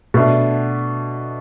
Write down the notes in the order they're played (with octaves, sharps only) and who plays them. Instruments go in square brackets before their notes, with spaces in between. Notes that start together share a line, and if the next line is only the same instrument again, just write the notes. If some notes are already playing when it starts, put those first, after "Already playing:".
[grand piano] B2 A3 D4